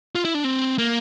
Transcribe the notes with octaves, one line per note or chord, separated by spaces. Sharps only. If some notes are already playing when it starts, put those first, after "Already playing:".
F4
E4
D4
C4
A#3